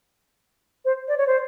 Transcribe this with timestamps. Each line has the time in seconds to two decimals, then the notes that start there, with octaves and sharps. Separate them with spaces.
0.85 C5
1.08 D5
1.18 C#5
1.27 C5